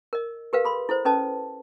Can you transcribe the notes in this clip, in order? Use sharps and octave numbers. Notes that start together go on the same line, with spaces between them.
A#4 D#5
G4 A#4 B4 F5
A4 B5 C6
E4 A4 C5
C#4 A4 B4 D#5 A5